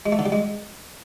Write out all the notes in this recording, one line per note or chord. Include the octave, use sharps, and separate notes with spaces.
G#3
A3
D3
G3
G#3